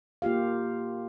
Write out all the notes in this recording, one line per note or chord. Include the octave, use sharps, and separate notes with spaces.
A#3 F4 G4 F5